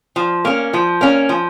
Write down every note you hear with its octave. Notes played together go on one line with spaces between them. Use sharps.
F3
A#3 C#4
F3
A#3 C#4
F3